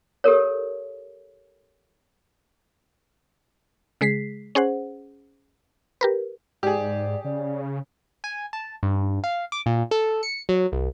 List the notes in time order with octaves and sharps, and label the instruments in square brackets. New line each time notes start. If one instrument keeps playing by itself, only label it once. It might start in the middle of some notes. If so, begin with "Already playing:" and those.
[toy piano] G4 A4 A#4 C#5
[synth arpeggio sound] C#3 G#3 G#4 B6 C7
C#4 G#4 C5 F#5
G4 A#4 B4
[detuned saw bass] G#2 [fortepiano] G4 G#4 [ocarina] D5
[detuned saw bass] C#3 [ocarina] D5
[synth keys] G#5
A5
G2
F5
D6
A#2
A4
C#7
F#3
C2